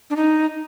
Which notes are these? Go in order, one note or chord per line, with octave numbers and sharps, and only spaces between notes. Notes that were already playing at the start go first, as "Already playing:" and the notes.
D4
D#4